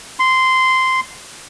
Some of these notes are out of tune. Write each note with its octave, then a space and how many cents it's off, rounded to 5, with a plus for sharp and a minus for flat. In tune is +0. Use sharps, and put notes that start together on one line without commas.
C6 -10